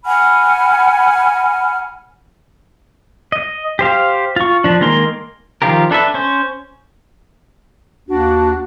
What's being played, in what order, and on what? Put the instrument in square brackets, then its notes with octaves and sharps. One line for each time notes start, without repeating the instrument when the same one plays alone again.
[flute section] F#5 G#5 B5 F6
[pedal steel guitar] D#5
G4 C5 F5
F4 C#6
F3 D4
D#3 G#3 A#3 A#4 C6
D#3 F3 F4 G4 A#4
D4 A4 B4 E5
C#4 C5
[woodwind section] D#2 A#3 D4 [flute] F#4